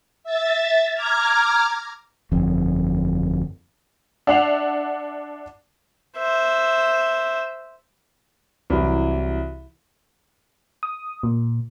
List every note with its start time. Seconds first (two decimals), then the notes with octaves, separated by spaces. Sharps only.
0.24 E5 A6
0.93 A#5 D6 F6 G#6
2.32 G1 F2
4.27 D4 E5 F#5 D6 C7 F7
6.17 C5 E5
8.70 C2 E3 F#3
10.83 D#6
11.23 A#2